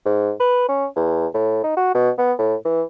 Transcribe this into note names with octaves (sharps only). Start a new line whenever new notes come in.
G#2
B4
C#4
E2
A2
D#4
F#4
B2
B3
A2
E3